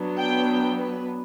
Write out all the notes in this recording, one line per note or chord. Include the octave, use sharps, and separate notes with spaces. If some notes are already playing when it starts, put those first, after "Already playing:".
Already playing: F#3 B3 D4
G5
B4